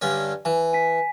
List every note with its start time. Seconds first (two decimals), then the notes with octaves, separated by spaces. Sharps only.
0.02 G2 D3 C#4
0.45 E3 G#5
0.73 G#5 B6